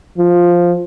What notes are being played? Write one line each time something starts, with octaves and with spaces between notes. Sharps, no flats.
F3